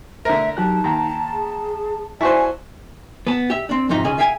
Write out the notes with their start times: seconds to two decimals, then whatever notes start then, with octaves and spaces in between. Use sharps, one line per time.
0.25 D3 A3 A#4 E5
0.57 F#3 D#4 G4 A5 F#6
0.84 D#2 G5 A#5
1.32 G#4
2.21 E4 F#4 C5 D5 G#5 A5 C#6
3.27 B3 A5
3.50 G4 E5
3.69 C4 D4
3.89 F2 G#2 C3 D#4
4.04 C#2 C#3 C#4 G#4 D#5
4.18 G#4 E5 F5 G5 G#5